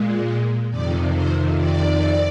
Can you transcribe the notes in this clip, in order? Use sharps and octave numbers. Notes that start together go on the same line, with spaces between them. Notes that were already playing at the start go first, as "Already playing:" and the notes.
Already playing: A#2 G#3
F2 C3 D#3 D5
C5
D5